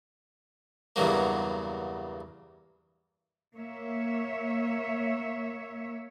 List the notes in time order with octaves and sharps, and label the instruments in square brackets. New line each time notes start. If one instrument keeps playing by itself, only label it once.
[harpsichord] E2 G2 C#3 F#3 A#3
[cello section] A#3 C#5 E5